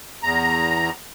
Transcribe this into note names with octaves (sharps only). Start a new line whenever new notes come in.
E2 A#5